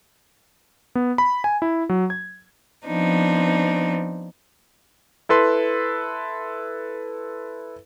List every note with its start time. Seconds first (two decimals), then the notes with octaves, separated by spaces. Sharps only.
0.95 B3
1.18 B5
1.44 G#5
1.62 E4
1.89 F#3
2.10 G#6
2.87 F3 B3 C4 D4 D#4
5.29 E4 A4 B4 C6